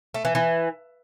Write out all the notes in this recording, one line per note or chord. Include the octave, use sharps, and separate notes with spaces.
A3
E3
E3